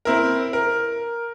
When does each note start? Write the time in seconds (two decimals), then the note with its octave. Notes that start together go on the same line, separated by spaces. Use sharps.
0.05 C4 E4 A#4
0.53 A#4